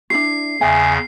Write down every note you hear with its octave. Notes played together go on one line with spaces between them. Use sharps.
D4 E4 F#4 C7
E2 C#3 E5 G#5